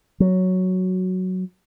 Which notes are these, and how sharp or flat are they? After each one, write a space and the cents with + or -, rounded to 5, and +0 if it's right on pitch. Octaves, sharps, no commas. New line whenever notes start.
F#3 +0